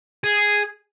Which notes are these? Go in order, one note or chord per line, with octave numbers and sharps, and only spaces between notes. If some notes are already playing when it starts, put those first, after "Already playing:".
G#4